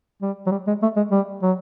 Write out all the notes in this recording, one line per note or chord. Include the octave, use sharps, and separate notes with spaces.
G3
F#3
G3
G#3
A3
G#3
G3
F#3